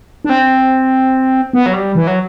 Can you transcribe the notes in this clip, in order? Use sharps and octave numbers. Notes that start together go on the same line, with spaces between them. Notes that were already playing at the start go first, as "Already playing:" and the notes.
D4
C4
B3
F#3
G3
E3
F#3